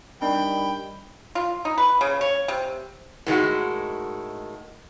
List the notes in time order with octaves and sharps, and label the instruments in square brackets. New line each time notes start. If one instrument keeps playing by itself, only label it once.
[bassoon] D#3 [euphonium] G3 [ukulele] D4 [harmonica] G5 B5
[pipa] F4
D#4
B4
C#3
C#5
C3
[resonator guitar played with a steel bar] A2 D#3 G#3 F#4